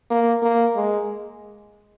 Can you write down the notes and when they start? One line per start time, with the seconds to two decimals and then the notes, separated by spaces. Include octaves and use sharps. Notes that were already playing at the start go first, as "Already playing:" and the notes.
0.11 A#3
0.43 A#3
0.76 G#3